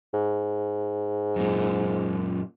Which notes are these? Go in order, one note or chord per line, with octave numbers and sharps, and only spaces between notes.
G#2
F#2 A#2